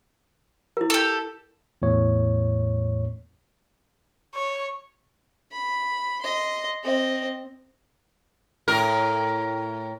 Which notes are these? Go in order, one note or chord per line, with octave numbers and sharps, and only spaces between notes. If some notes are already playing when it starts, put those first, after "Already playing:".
E4 A#4
G4 A4
E2 A2 C#5
C#5
B5
D#5 C6
C4 D#5
A2 A#4